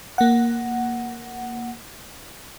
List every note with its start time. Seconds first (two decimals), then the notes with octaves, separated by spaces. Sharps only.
0.18 A#3 F#5